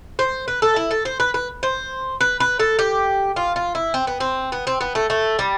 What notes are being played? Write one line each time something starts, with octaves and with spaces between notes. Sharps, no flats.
C5
B4
A4
E4
A4
C5
B4
B4
C5
B4
B4
A4
G4
F4
F4
E4
C4
B3
C4
B3
C4
B3
A3
A3
G3